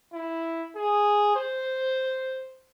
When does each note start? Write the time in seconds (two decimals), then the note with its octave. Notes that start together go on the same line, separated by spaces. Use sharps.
0.13 E4
0.76 G#4
1.36 C5